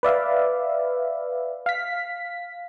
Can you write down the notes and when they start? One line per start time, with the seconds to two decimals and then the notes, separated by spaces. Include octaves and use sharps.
0.03 B4 D5 E5 F5
1.66 F5 B6